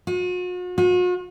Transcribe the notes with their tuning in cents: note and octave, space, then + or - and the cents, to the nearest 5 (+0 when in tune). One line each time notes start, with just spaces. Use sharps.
F#4 -45
F#4 -45